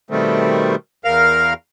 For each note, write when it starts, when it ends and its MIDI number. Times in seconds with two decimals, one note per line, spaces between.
0.10 0.75 47
0.10 0.75 51
0.10 0.75 55
0.10 0.75 57
0.10 0.75 60
1.05 1.53 40
1.05 1.53 70
1.05 1.53 77
1.05 1.53 89